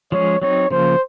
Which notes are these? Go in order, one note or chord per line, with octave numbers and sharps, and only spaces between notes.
F3 G#3 C#4 G#4 C#5
F#3 C4 D#4 C#5
C#3 F3 A#3 C5